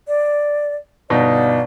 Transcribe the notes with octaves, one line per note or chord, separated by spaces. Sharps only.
D5
G1 B2 D#4 D5 F5